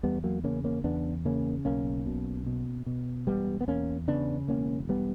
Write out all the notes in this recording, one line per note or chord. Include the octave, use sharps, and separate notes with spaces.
E2 G3 B3
F#3 A#3
C#3 A#3 C#4
A#3 C#4
E2 B3 D4
C#3 A#3 C#4
B1 A#3 C#4
B2
B2
B2
E1 G3 B3
B3
E2 A#3 C#4
C#3 B3 D4
E1 A#3 C#4
G3 B3